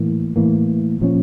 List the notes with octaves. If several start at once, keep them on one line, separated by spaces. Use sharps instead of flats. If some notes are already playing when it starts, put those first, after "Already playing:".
Already playing: A2 E3 A#3
A2 E3 A#3
A#2 F3 C#4